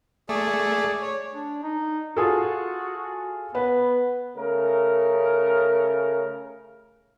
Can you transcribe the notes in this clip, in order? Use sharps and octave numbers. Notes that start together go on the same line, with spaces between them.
A3 G#4 D5
C#5
D4
D#4
F4 F#4 G#4 A4
B3 B4
C#3 A3 A#4